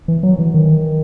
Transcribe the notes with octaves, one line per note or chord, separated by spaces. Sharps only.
E3
F#3
E3
D#3